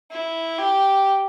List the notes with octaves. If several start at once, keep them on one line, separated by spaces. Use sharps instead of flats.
E4
G4